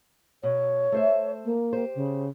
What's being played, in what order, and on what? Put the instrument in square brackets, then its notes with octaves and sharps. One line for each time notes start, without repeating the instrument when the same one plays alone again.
[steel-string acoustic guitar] B2 [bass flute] C#5
[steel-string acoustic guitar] A3 C5 E5
[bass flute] A#3
[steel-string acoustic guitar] G4 C5
[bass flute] C#3